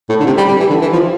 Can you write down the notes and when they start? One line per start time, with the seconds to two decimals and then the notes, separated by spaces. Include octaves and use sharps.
0.09 A2
0.20 D3
0.26 C3
0.38 G3
0.48 G3
0.60 E3
0.70 D3
0.82 E3
0.93 F3